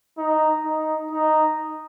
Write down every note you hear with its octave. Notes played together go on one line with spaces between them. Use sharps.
D#4
D#4
D#4